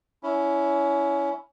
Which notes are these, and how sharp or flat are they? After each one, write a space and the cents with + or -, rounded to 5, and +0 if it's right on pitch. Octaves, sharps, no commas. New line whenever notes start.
C#4 +20 E4 +0